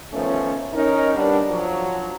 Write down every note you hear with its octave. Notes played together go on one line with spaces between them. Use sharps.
D#3 F3 A3 B3 C#4
C#4 D#4 A#4
G3 B3 D4
F3 F#3